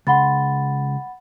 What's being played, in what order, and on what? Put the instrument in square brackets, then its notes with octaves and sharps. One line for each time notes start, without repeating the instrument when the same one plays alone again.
[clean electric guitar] C#2 C6 [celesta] F#5 B5 A6